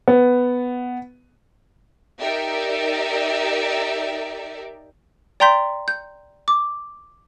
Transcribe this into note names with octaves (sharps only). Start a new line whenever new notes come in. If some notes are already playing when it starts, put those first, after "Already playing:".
B3
D#4 G4 A#4 D5 E5
D5 G5 A#5 C6 G6 B6
G6
D6